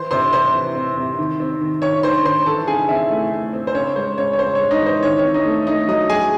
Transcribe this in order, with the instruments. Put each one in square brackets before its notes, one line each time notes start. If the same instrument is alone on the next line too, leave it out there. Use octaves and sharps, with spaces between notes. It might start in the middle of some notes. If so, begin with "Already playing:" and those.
Already playing: [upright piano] E3 C5 C6
C3 C5 C6
C3 C5 C6
E3
C4
C3
D#3
C4
D#3
D#3 C#5 C#6
D#3 C5 C6
D#3 C5 C6
E3 A4 A5
C#3 G#4 G#5
C4 E4 E5
A3
A3
C4
C5
C#3 C#5
G#3 C5
C#3 C#5
C#5
C#3 C5
G#3 C#5
D#4 D#5
E3 C5
D#3 C#5
C4 C#5
D#4 D#5
A3
A3 D#4 D#5
F#3 D#4 D#5
F#3 G#4 G#5